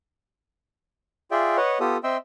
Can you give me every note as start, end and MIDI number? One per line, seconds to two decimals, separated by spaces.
1.31 1.57 65
1.31 1.57 68
1.31 1.57 74
1.31 1.57 76
1.31 1.57 79
1.57 1.78 71
1.57 1.78 73
1.57 1.78 75
1.57 1.78 78
1.80 1.97 59
1.80 1.97 65
1.80 1.97 67
1.80 1.97 69
1.80 1.97 87
2.04 2.17 60
2.04 2.17 75
2.04 2.17 76
2.04 2.17 79
2.04 2.17 84
2.04 2.17 88